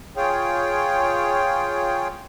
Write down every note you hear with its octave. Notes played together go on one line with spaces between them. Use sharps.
F4 G#4 C#5 G5